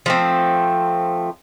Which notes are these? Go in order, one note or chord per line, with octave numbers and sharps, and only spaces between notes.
F3 A3 C4